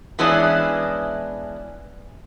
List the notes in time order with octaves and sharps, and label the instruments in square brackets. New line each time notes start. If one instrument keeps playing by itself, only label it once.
[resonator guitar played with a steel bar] E3 G#3 B3 C#4 D4 E4